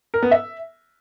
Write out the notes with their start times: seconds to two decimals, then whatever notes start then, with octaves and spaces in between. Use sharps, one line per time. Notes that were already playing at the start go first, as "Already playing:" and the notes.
0.14 A#4
0.23 B3
0.31 E5